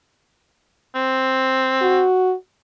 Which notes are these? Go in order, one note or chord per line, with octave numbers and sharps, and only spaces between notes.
C4
F#4